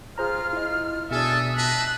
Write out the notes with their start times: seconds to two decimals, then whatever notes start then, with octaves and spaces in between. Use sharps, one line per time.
0.18 F4 G#4 C5 A#5 F6
0.53 E4 D#5
1.11 B2 D4 G#4 A4 E5 D#6
1.57 F4 D#5 E5 A5 F#6